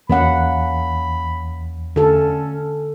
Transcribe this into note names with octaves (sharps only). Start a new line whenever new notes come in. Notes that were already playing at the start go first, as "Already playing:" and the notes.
E2 A#3 C#4 F#5 B5
D3 C#4 A4